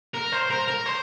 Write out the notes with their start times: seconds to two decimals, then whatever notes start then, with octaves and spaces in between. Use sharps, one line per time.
0.14 A#4
0.32 C5
0.50 A#4
0.68 A#4
0.86 C5